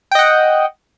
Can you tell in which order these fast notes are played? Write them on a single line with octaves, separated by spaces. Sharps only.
G5 D#5 F#5